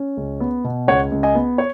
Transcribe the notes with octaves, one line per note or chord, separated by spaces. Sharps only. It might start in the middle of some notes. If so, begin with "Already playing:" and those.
Already playing: C#4
C#2
B3
B2
C#2 C#5 F#5
C#2
D#5 G#5
B3
C#5